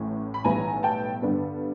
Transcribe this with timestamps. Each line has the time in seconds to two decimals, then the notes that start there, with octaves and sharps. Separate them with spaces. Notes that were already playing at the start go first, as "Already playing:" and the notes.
Already playing: A1 A2 E3
0.34 B5
0.44 B1 A2 E3 G3 B3 G#5 A#5
0.83 G5 A5
1.22 G2 D3 G3 B3 D4